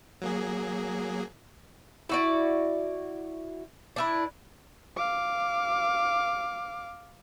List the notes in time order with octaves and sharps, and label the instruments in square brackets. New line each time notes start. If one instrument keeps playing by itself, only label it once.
[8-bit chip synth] F#3 A#3 G#4
[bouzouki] E4 F#4 D5
D4 E4 B4
[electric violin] F5 D6